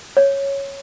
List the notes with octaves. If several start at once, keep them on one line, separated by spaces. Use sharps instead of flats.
C#5